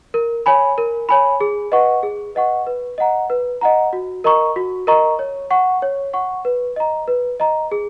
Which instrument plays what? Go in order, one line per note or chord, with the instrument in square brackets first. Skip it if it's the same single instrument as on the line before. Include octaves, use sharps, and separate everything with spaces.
[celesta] A#4
C#5 G#5 B5
A#4
C#5 G#5 B5
G#4
B4 D#5 F#5 C#6
G#4
B4 D#5 F#5 C#6
B4
D#5 F#5 A#5
B4
D#5 F#5 A#5
F#4
A#4 D#5 A#5 C#6
F#4
A#4 D#5 A#5 C#6
C#5
F#5 C#6
C#5
F#5 C#6
B4
D#5 A#5
B4
D#5 A#5
G#4